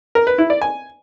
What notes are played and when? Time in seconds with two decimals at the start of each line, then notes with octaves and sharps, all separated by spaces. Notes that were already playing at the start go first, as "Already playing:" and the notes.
0.15 A#4
0.27 B4
0.38 E4
0.50 D5
0.62 G#5